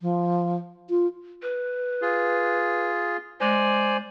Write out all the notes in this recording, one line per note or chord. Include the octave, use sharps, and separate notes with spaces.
F3
F4
B4
F4 G#4
G#3 C5 D5 G#5